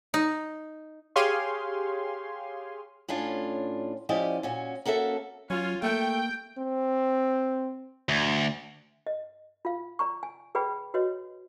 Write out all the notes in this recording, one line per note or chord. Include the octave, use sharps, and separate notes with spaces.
D#4
G4 G#4 C#5 F5 G#5 C6
A2 C#4 D4 F4
F3 C#4 E4 G4 D5 D#5
A#2 C#4 F#4
A#3 C#4 F#4 A4 E5
F#3 C#4 F4
A3 A#3 G5
C4
D2
D#5
F4 F5
D5 A#5 C#6
G#5
G#4 B4 D5 G5 B5
F#4 B4 C#5 D#5